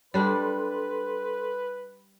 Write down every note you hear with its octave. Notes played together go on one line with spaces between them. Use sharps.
G3 D4 A4 B4 C6